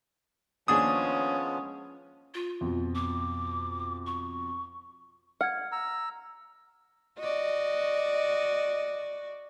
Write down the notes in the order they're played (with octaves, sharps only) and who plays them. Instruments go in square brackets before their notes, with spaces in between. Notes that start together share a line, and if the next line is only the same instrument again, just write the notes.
[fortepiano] D#2 D4 G#4 [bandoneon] F3 G#3 B3 [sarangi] C#4 [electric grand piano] D#6
[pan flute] F4
[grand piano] F2 B2
[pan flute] D6
C#6
[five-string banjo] F#5 [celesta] F6 G#6
[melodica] A#5 E6
[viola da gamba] F#4 D5 [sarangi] D#5